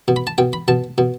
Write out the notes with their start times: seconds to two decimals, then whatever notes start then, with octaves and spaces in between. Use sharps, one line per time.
0.08 B2
0.16 B5
0.27 A5
0.38 B2 G5
0.53 B5
0.68 B2 A5
0.98 B2